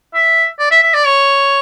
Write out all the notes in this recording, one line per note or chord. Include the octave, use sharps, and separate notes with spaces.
E5
D5
E5
E5
D5
C#5